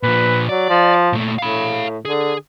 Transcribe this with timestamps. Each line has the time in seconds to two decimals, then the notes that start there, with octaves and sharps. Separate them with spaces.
0.03 A#2 F3 B4
0.49 F#3 D5
0.70 F3
1.13 A#2 A3
1.38 A2 F5 B5
2.05 D3 G#4